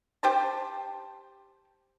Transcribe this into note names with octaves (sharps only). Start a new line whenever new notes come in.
G4 C5 A5